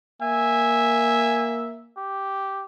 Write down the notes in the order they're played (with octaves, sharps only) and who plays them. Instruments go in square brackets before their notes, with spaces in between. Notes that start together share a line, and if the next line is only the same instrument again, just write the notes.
[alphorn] A#3 [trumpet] E5 [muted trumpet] G#5
[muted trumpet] G4